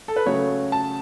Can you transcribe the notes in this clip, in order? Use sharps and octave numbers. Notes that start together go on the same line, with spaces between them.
A4
B4
C#3 F#3 A3 C#5
A5